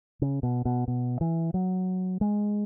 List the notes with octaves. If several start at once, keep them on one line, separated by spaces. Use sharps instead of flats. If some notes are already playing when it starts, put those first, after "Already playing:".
C#3
B2
B2
B2
E3
F#3
G#3